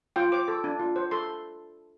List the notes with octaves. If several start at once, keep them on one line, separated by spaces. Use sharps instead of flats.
F4 G5
C5 D6
A4
D4
F4
C5
A4 C6